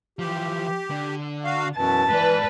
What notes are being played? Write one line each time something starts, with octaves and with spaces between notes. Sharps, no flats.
E3 F3 G4
D3
F#4 F5
F#2 B2 E3 A5
E3 G#3 B4 D5